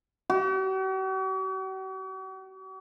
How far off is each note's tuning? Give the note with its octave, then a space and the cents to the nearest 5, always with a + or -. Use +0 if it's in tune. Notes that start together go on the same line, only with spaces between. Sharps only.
F#4 +45